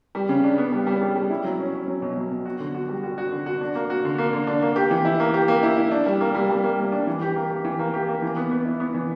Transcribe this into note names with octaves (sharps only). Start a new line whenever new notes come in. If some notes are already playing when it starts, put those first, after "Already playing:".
G3
C#3
D4
B3
G3
G3
G3
G3
E4
F#3
C#4
C#4
F#3
B2
F#3
B2
F#4
D3
F#4
G3
F#4
F#4
D3
F#4
D4
A#3
F#4
D3
A#3
D3
D4
A#3
G4
E3
E4
A#3
G4
A#3
E4
E4
D4
G3
A#3
G3
G3
A#3
G3
D4
E3
G4
A#3
G4
E3
A#3
G4
A#3
E3
B3
B3
E4
B3
E3